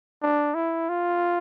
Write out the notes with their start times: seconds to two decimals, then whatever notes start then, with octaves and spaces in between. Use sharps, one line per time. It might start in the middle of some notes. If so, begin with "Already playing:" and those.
0.22 D4
0.55 E4
0.89 F4